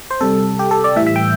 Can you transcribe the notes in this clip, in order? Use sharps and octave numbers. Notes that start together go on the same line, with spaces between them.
C5
C3 G3 A4
G4
A4
D5
A2 E3 G3 E5
E5
G5